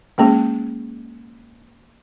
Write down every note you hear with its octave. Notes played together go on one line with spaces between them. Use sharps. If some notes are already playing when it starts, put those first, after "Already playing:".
G#3 A#3 C#4 G#4